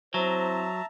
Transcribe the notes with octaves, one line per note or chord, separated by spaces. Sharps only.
F#3 C4 E4 C5 E5 A5 A#5